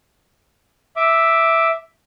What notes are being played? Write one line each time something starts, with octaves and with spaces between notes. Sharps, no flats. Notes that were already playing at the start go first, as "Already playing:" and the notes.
E5 D6